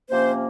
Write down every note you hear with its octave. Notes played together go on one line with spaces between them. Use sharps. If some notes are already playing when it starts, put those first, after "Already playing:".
C3 F3 A#3 C#4 C5